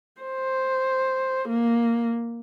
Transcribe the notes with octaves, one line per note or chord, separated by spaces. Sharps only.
C5
A#3